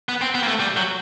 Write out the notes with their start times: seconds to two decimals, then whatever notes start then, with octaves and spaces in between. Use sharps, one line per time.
0.09 B3
0.22 C4
0.35 B3
0.43 A#3
0.48 A3
0.60 G3
0.77 F#3